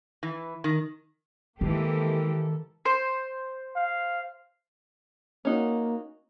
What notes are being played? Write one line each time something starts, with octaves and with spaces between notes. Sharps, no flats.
E3
D#3
D#3 E3 G#3 A#3 G4 A4
C5
F5
A#3 C#4 D#4 F#4